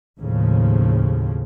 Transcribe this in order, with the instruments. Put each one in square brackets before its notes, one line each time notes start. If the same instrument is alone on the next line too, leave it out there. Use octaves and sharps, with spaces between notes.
[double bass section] D#2 A2 C#3 F3